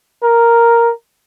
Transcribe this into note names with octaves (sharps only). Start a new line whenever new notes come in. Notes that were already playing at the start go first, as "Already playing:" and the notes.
A#4